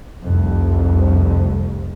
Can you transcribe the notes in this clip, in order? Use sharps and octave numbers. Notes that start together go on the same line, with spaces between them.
F1 C2 F2